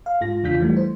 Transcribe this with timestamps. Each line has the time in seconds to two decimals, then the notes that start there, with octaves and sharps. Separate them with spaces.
0.06 F5
0.21 G#2 F4 A#6
0.43 E2 C#3 D4 F4 G6 B6
0.60 E3 G3 A3
0.77 C5